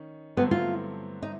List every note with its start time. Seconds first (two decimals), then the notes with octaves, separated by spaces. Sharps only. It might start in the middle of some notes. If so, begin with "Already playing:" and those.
Already playing: D#3 C#4
0.37 G2 D3 F#3 A3 B3 C4
0.51 F4
1.22 D#4